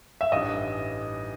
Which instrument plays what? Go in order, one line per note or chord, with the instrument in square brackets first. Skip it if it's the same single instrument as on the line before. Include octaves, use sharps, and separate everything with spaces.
[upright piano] E5
[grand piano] A1 G2 E3 G3 D#4 [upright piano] D#5